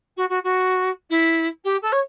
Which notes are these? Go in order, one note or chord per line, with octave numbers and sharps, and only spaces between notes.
F#4
F#4
F#4
E4
G4
A4
C#5